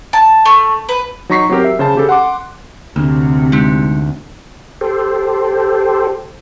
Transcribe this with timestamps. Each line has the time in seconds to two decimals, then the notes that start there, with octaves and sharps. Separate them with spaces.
0.13 A5
0.45 A3
0.89 B4
1.29 F#3 D#4 A#5 C#6 B6 C7
1.49 F#3 C4 G4 A#4
1.64 E5
1.79 C#3 C5 A5
1.95 C#3 G4 A4
2.09 F#5 C6 D6
2.96 D2 C3
3.52 G#3 D#4
4.81 G4 A4 C5